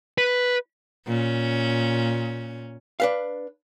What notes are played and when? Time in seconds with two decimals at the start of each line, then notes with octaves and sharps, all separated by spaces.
0.18 B4
1.06 A#2 C#4
3.00 D4 B4 F5